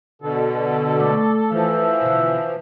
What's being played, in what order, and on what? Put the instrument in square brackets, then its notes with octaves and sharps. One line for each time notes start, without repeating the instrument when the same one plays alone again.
[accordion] B2 D3 [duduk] A4
[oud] A3 [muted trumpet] D5
[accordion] E3 F3 [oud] A3 [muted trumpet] E5
[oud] B2 D3